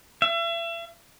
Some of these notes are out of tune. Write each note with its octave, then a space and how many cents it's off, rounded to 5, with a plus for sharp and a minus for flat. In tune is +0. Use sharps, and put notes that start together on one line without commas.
E5 +40